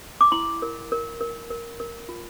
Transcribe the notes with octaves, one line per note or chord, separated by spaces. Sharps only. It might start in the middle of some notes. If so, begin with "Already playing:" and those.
D6
E4 C6
A#4
A#4
A#4
A#4
A#4
F4